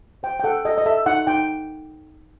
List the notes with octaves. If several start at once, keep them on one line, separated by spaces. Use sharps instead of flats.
C5 G5
G5
A4 F#5
A4 D#5
D#5
A4 E5
D#4 F#5
D#4 G5